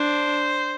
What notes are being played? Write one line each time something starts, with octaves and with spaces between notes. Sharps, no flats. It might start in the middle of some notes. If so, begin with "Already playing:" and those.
Already playing: D4 C5